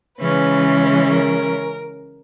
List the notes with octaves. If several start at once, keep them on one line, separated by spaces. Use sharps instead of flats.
C#3 E3 G#3 C#4 B4
A#4